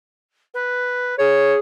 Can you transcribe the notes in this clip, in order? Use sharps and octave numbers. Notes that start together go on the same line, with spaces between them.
B4
G#4 C#5